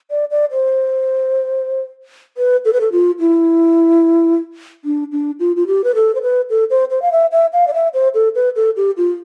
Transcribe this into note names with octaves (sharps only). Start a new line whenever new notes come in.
D5
D5
C5
B4
A4
B4
A4
F4
E4
D4
D4
F4
F4
G4
B4
A4
C5
B4
A4
C5
C5
F5
E5
E5
F5
D5
E5
C5
A4
B4
A4
G4
F4